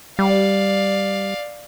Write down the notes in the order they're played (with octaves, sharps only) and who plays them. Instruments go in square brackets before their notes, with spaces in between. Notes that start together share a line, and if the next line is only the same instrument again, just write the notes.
[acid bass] G3 [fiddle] D5 F5